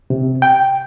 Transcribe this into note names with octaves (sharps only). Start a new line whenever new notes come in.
C3
G5